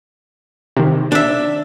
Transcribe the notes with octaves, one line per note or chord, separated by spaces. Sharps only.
C3 D#3
D4 E5